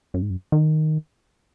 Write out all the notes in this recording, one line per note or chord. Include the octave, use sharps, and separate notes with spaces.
F#2
G#2
F#2
D#3